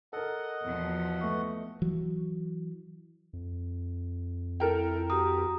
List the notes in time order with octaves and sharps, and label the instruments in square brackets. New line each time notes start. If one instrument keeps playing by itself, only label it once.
[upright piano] A4 A#4 [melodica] D#5 F#5
[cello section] E2 B2 F3
[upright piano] A3 B3 C#6
[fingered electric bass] E3 F#3
[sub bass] F2
[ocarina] E4 [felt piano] A4 A#4 G5
[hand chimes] F#4 A#5 D#6 [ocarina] G4